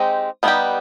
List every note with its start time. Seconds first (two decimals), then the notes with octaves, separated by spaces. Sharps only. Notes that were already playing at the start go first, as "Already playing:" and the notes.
Already playing: G#3 C4 D#4 G4
0.43 G3 B3 D#4 G4